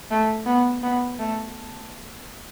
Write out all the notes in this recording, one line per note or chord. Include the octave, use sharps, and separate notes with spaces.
A3
B3
B3
A3